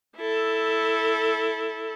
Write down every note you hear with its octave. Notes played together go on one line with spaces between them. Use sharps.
E4 A4